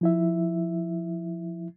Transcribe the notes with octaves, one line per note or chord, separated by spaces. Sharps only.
F3 E4 E5